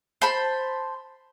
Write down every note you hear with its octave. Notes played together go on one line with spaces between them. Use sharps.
C5 A5 B5